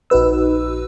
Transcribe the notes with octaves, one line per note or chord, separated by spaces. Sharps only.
A#1 D#4 F#4 B4 E6